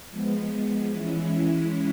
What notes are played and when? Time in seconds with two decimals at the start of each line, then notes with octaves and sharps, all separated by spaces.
0.11 F3 G#3 B3
0.92 E3 G#3 C#4 E4